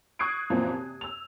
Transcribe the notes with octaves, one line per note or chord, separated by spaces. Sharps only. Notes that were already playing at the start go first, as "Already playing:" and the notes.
C#6 D#6 F#6 G#6 C7 D7
F#2 A#2 E3 F3 A#3 C4
C3
E6 F7